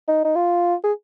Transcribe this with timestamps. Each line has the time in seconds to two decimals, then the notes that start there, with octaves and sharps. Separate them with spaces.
0.08 D#4
0.25 D#4
0.35 F4
0.84 G#4